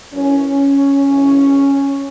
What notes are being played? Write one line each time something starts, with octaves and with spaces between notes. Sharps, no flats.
F#2 E3 C#4
F#2 C#3 E3